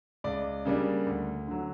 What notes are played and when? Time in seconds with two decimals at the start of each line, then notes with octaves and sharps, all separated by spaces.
0.24 C#2 D5
0.65 C#3 G3 A#3 D4
1.06 D2
1.48 D3 F#3